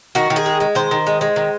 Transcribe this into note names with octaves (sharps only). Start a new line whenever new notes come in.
D#3 F#4
D#3
G#4
G#3
G#3
D#3 C5
D#3
G#3
G#3
D#3